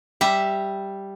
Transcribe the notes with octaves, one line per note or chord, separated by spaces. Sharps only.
G3 E5